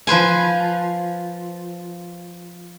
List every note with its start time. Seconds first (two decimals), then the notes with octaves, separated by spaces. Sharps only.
0.07 F3 B4 C5 G#5